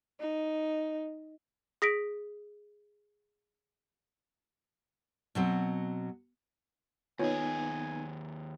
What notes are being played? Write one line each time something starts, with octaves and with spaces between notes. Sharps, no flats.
D#4
G#4 A#6 B6 D7
B2 F#3 C4
D#2 B3 D#4 F4 G#4 C#5 G#5